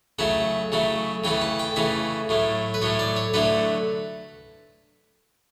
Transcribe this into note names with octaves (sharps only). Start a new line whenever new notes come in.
C#3 F#3 A3 E4 F#5
C#3 F#3 A3 E4
C#3 E3 A3 E4 G5
A5
G5
C#3 E3 A3 E4 E5
A2 F#3 A3
B4
A2 F#3 A3 C#5
D5
C#5
D3 F#3 A3 E4 B4